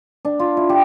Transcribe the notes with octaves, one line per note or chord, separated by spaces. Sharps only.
D4
F4
E4
G4